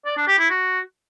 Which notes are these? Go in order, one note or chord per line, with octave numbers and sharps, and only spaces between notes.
D5
D4
G4
E4
F#4